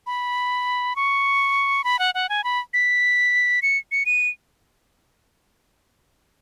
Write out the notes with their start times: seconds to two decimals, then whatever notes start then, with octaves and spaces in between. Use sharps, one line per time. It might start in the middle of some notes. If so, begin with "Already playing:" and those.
0.07 B5
0.96 C#6
1.84 B5
1.99 F#5
2.15 F#5
2.29 G#5
2.44 B5
2.74 B6
3.62 C#7
3.92 C#7
4.06 D#7